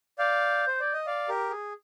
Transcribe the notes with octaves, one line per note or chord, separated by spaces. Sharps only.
D5 F5 G6
C5
D5
D#5
D5 F5
G4 A#4
G#4